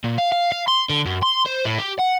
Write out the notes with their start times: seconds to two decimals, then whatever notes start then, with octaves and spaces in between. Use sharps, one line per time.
0.04 A#2
0.18 F5
0.32 F5
0.52 F5
0.68 C6
0.90 D3
1.06 F#2
1.23 C6
1.46 C5
1.65 A2
1.78 G4
1.99 F#5